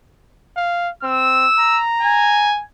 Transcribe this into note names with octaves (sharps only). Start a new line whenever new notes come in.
F5
C4 E6
A#5
G#5